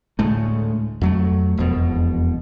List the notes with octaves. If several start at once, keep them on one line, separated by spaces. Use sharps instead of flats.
D2 A2 G#3 A3
F2 F#3 A3
E1 F2 B2